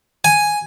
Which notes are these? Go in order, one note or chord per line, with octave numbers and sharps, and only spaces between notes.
G#5